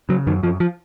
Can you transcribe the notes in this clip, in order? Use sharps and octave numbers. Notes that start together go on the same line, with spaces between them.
C#3 F#3
F#2 D#3
F#2 F3
F3